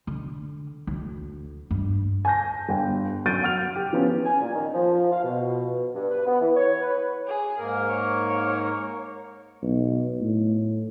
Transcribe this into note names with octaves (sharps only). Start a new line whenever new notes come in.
D3
D2
G2
G#5 A5 G6 A#6
G1 G5
F#2 G6 A6 D7 D#7
F#5 F6 F7
G4
F3 B3 C#4
G#5
A#2
D#3
F3
F5
B2
G2
B4
B3
E3
C#5
B4
G#4
G#2 A#3 A#4
C#5
B1
A2